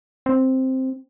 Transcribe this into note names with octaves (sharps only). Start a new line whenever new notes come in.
C4